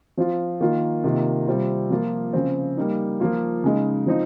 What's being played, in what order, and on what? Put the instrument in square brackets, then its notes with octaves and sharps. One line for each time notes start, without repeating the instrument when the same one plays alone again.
[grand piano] F3 C4 F4
D#3 A#3 F4
C3 D#3 A#3 F4
C3 G3 C4 F4
F3 A#3 F4
C#3 F3 C4
G3 A#3 D#4
F3 A#3 F4
C#3 G#3 D#4
F3 C4 D#4